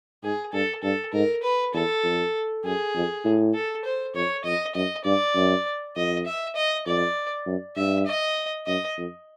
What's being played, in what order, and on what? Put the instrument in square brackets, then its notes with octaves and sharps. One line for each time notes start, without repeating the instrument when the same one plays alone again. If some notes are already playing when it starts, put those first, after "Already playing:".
[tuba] G#2 [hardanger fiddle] G#4
[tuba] G2 [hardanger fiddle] A4
[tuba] G2 [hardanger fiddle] A4
[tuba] G#2 [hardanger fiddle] A#4
[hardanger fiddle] B4
[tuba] E2 [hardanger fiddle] A4
[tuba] F2
[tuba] F#2 [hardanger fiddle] G#4
[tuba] F2
A2
[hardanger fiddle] A4
C5
[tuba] F2 [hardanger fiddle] C#5
[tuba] F2 [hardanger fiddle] D#5
[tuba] F#2 [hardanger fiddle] D#5
[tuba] G2 [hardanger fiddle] D5
[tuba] F#2
[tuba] F2 [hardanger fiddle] D#5
[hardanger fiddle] E5
D#5
[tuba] F2 [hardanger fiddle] D5
[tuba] F#2
[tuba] G2 [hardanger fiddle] E5
[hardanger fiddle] D#5
[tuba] F#2 [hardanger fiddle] D#5
[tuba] F2